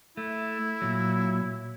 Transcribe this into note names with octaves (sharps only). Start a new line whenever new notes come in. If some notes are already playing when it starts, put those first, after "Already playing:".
A3 E4
A#2 F#3